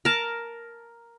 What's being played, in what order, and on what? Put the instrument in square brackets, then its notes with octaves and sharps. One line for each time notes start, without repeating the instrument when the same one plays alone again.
[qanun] A#4 A5